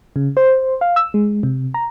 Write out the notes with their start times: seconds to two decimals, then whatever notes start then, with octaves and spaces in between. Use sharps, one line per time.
0.16 C#3
0.37 C5
0.81 F5
0.96 E6
1.14 G#3
1.43 C3
1.74 A#5